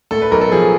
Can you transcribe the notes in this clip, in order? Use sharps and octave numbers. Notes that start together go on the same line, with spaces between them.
A2 A4
B4
B1 A#4
A4
F3 G#4